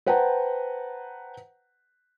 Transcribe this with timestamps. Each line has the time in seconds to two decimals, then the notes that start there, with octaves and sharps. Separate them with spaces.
0.06 B4 C5 F#5 G5 A5 A#5